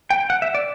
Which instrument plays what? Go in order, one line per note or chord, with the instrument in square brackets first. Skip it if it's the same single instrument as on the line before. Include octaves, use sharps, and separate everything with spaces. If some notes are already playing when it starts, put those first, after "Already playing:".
[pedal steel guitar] G5
F#5
E5
D5